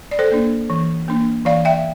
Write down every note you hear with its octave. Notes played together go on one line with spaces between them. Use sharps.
D5
A4 C5
A#3 D4
E3
A#3 D4
E3 D5 F5
E5 G5